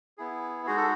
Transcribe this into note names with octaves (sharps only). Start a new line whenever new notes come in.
B3 E4 G#4
G#3 D#4 F#4 G#4
A4